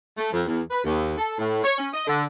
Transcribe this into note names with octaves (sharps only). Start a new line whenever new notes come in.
A3
F2
E2
B4
D#2
A4
A2
C#5
C#4
D#5
D3